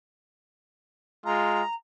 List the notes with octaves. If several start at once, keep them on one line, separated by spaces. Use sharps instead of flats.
G#3 F4 A#5